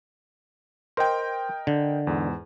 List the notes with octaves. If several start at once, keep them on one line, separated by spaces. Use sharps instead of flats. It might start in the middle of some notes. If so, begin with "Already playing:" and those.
A#4 C5 D#5 G5
D3
E2 G#2